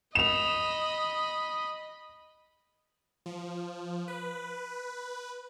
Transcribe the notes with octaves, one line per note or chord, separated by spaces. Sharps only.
D#5 B5 E7 F7
F3
B4